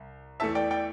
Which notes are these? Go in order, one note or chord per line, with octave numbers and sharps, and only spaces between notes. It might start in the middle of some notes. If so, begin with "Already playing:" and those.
Already playing: C2
E2 E3 A3 E5 A5
D5 G5
D5 G5